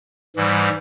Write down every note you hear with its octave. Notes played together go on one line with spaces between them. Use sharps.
G#2 E3 G3